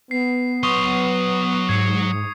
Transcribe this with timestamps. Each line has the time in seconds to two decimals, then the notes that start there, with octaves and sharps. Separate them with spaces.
0.11 B3 C7
0.63 F#3 C6 C#6 D#6 F7
1.69 G#2 G#6 C7 C#7